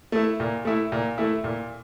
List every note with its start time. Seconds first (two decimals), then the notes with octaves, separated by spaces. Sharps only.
0.12 A3 E4
0.40 A#2
0.65 A3 E4
0.92 A#2
1.18 A3 E4
1.44 A#2